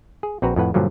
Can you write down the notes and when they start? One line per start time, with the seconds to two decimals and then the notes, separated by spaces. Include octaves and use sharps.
0.23 G#4
0.42 A#1 C4 F#4 B4 A#5
0.56 F2 A2 B4 F#5
0.74 G2 A#2 D3 F3 F#3